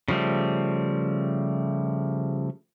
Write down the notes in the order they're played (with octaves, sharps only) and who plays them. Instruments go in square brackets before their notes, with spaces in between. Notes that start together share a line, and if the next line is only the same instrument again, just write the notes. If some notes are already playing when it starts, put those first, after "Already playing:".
[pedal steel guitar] C#3 F3 G3 A3